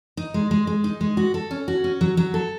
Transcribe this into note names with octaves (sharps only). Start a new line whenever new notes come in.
D#4
G#3
G#3
G#3
D#4
G#3
F#4
A4
C#4
F#4
C#4
F#3
F#3
A4